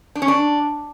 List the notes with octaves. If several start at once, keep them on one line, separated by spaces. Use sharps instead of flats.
D4
C#4
D4